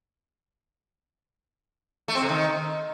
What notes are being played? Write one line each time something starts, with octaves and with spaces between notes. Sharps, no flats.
A3
C4
C3
D#3